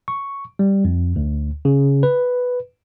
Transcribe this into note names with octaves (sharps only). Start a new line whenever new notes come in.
C#6
G3
F2
D2
C#3
B4